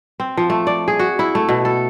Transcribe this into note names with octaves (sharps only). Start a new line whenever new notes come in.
C4
F3
A3
D5
G#4
F#4
E4
A3
B2
A4